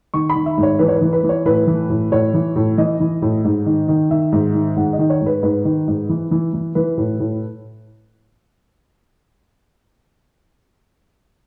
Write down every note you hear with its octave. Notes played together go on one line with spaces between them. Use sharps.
D#3 C#6
B5
D#3
E5
G#2
C#5
E3 B4
C#5
B4
E3
B4
E3
C#5
A2 B4
E3
A2
A2 C#5
E3
A2
E3 D#5
E3
A2
G#2
D#3
D#3
D#3 E5
G#2
D#3
G#2 F#5
D#5
D#3
C#5
G#2
B4
G#2 B4
D#3
G#2
E3
E3
E3
E3 B4
A2
A2